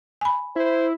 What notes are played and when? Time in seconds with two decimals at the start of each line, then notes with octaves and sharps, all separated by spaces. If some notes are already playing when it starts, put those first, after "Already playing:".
0.21 G#5 B5
0.56 E4 C5